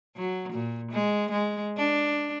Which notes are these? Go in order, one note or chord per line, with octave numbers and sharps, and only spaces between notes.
F#3
A#2
G#3
G#3
D4